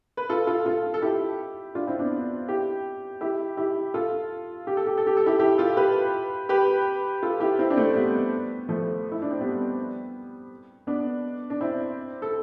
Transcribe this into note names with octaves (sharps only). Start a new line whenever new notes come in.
B4
F4 A4
F4 A4
F4 A4
A4
E4 G4
D4 F4
C4 E4
B3 D4
E4 G4
E4 G4
E4 G4
F4 A4
G4
A4
G4
A4
G4
A4
E4 G4
E4 G4
F4 A4
G4 B4
G4 B4
F4 A4
E4 G4
C4 E4
D4
A3 C4
G3 B3
F3 A3
E4
D4
C4
G3 B3
B3 D4
D4
C4 E4
A4